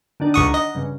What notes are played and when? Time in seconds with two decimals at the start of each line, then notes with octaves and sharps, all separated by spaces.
0.20 D3 D#3 D4
0.34 C#2 F#5 A#5 C#6 D#6
0.54 D#5
0.75 G2 C#3